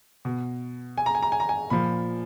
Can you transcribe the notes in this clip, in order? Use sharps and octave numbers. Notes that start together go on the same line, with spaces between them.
B2
G#5
A#5
G#5
A#5
G#5
A#5
G#5
A#2 F3 B5